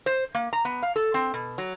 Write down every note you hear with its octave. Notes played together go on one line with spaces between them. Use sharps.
C5
A#3
A#5
B3
F5
A4
C4
B2
F#3